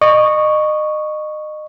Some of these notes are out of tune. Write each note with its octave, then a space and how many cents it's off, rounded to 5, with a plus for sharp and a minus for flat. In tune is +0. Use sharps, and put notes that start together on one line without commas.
D#5 -30 C#6 +0